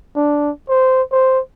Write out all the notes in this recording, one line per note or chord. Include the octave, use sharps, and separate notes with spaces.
D4
C5
C5